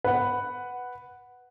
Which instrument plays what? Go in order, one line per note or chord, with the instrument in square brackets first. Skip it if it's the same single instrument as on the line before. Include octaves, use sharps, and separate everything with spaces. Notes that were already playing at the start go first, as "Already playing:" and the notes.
[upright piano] B4 F#5